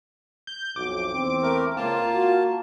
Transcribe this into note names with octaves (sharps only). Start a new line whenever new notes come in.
G6
B1 F2 D6
E2 C4
A3 A#4
C#2 A#3 F4 A5
F#4